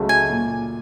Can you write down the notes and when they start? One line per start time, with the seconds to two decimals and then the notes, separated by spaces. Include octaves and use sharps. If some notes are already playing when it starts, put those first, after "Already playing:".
Already playing: C#2 C#3 F#3 A3
0.09 G#5
0.30 A#2